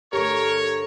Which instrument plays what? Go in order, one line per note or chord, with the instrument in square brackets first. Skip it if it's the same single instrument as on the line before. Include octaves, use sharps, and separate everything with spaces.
[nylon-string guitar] G2 D3 A3 [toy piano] G4 [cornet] A#4 [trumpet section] C#5